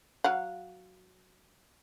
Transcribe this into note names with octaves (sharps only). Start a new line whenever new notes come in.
F#3 F5 F#5